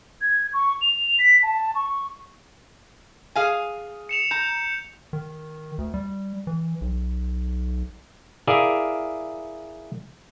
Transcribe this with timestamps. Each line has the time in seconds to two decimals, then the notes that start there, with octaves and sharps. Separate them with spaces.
0.21 G#6
0.53 C#6
0.82 F7
1.19 B6
1.43 A5
1.75 C#6
3.35 G#4 F5 G#5
4.09 C#7 E7 F7
4.31 A#5 G6
5.13 D#3
5.78 D2
5.94 G3
6.47 E3
6.81 B1
8.47 E4 G#4 A#4 D5 E5 F5